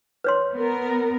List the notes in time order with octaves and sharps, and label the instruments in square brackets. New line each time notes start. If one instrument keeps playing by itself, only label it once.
[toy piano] B4 C#5 C6
[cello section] B3 A#4